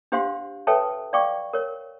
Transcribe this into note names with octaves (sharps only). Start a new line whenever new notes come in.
D4 G4 C5 F5 F#5 C6
A4 B4 C#5 E5 G5 A5
D5 F5 G5 C#6 D6
A#4 C#5